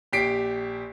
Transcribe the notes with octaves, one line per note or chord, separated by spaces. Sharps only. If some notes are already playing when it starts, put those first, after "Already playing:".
A#1 G4 B6 C7 D7